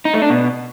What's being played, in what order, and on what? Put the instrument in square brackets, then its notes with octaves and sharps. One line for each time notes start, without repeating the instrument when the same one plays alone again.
[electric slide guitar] D#4
A3
D4
B2